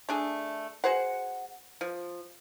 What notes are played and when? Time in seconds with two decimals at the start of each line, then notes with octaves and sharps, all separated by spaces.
0.09 A3 D4 G#4
0.84 F#4 G#4 C5 F#5
1.81 F3